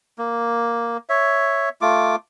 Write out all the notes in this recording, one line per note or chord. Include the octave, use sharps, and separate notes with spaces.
A#3
C#5 E5
A3 F4 D6